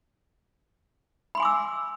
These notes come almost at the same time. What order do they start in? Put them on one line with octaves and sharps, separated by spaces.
B5 C6 G#5 D6 E6